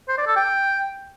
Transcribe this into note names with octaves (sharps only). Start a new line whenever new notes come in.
C5
D5
A4
G5